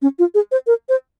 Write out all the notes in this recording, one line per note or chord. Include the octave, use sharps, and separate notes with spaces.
C#4
F4
G#4
C5
A#4
C5